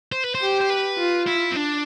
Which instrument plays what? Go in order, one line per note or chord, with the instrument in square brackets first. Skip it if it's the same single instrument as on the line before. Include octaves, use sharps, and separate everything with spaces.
[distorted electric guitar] C5
B4
C5
[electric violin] G4
[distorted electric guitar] C5
B4
[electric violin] F4
[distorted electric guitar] E4
C4
D4